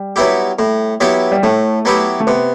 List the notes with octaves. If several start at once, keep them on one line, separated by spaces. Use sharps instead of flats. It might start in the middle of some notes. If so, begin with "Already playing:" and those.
Already playing: G3
F#3 B3 E4 G4
A2
F#3 B3 E4 G4
G3
A2 A3
F#3 B3 E4 G4
A3
C3 B3